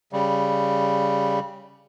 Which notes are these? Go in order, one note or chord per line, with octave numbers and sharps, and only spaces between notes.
C#3 G3